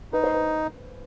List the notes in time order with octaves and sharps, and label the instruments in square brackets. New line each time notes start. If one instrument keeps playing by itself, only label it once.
[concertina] D#4 [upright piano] B4
[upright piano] C5
B4